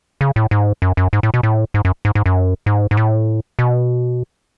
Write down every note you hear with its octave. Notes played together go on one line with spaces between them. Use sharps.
C#3
A2
G#2
F#2
F#2
G#2
A2
B2
A2
G#2
F#2
G#2
G#2
F#2
G#2
G#2
A2
B2